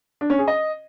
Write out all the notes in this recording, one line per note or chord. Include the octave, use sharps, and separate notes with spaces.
D4
C#4
G#4
D#5